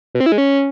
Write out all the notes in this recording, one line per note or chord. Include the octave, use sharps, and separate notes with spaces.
B2
C4
E4
G#3
C#4